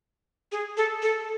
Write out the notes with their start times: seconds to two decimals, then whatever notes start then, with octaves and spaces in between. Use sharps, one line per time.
0.52 G#4
0.77 A4
1.02 A4